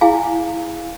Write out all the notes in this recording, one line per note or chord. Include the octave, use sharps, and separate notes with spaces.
E4 G#4 F5 G#5